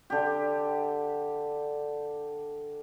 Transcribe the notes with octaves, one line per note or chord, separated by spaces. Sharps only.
D3 G4